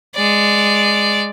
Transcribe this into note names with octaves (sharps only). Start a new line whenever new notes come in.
G#3 D5